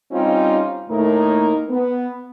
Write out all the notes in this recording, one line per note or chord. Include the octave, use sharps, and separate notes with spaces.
G3 C4 C#4 D#4 F4
D#2 A2 A3 A#3 D#4 A#4
B3